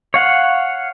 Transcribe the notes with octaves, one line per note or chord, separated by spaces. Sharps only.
C#5 F5 F#5